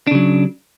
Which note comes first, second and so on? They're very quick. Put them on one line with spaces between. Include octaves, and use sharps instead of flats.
D4 C#3 F#3